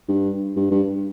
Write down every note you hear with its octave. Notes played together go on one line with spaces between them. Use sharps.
G2
G2
G2